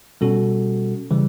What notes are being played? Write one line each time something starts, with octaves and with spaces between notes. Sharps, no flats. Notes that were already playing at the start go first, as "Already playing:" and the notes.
B2 G3 C#4 F#4 A4
C#3 E3 G3